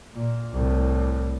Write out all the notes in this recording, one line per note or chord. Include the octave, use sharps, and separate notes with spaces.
A#2
C2 A2